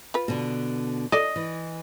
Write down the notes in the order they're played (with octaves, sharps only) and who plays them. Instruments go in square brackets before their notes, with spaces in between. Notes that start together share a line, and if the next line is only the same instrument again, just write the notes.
[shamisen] F4 B4
[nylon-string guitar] B2 D3
[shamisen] A4 D5 [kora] D#5
[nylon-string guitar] E3